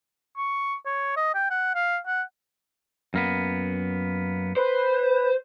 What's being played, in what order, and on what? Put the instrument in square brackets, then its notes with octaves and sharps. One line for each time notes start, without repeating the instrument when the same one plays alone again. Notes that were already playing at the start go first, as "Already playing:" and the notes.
[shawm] C#6
C#5
D#5
G5
F#5
F5
F#5
[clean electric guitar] F#2 A#3 B3
[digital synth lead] B4 [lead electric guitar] C5